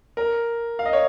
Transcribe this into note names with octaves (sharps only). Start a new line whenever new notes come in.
A#4
F5
D#5
C#5